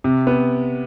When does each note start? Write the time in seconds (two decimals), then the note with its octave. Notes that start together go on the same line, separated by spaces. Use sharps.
0.04 C3
0.27 B3